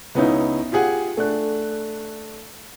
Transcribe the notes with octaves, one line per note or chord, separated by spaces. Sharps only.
C#2 B3 C#4 D#4 E4
F4 G4 G#4 F#5 G#5
A3 D4 F#6